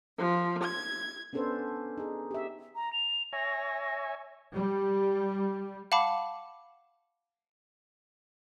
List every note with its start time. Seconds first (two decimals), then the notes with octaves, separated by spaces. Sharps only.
0.17 F3
0.62 G#6
1.33 B3 C#4 D4 A4 B4 C5
1.97 D#4 G#4
2.31 G4 E5
2.75 A#5
2.93 F7
3.33 C#5 E5 G#5 A#6
4.54 G3
5.92 F5 F#5 A5 B5 D6